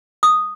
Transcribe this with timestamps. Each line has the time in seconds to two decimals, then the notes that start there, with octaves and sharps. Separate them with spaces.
0.23 D#6